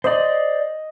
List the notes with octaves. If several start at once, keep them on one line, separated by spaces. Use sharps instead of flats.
C5 D5 D#5